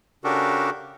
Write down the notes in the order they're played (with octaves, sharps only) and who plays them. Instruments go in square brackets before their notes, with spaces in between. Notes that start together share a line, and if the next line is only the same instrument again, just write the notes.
[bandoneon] C#3 D4 F#4 G4 A4 A#4